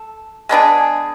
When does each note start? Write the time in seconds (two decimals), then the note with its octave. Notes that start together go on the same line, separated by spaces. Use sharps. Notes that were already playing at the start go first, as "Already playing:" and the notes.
Already playing: A4
0.49 G#3 B3 D4 G#4